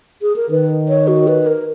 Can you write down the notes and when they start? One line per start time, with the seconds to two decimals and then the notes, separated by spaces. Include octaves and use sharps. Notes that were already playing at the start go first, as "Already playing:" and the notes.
0.22 G#4
0.36 A#4
0.50 D#3 B4
0.89 C#5
1.08 F#4
1.28 B4
1.46 A#4